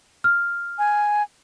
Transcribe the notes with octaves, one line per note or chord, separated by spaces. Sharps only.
F6
G#5